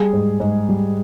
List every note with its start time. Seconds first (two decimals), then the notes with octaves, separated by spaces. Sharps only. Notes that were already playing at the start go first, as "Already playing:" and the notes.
Already playing: G3 G#4
0.13 G#2
0.40 G#2
0.69 G3